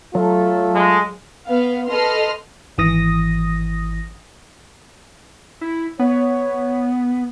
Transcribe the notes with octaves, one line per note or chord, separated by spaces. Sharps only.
F#3 A3 F4 A4
G#3
B3 F5
A4 B4 D#5 C6 F6
G#1 E3 D#6 A#6
E4
B3 C#5